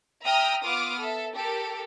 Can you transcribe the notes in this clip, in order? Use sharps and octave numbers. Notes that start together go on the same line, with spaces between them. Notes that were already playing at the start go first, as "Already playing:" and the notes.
E5 G5 A#5 D#6 F6
B3 F4 D6 D#6 F6
A4 E5
G4 A4 A#4